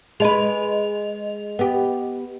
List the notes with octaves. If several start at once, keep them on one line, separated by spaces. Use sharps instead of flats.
G#3 B4 D#5 F7
B3 G4